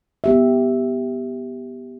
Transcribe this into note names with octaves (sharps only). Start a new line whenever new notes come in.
B3 G4 E5